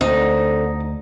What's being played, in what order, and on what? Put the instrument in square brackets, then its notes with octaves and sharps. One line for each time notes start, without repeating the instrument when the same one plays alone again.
[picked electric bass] D2 [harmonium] D3 [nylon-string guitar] C4 [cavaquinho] D#4